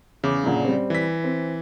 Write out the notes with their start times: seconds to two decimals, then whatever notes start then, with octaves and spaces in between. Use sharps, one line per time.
0.24 E2 C#3 D6
0.43 F#2 A#2 D3
0.64 G3 C4
0.90 E3 B6
1.24 C4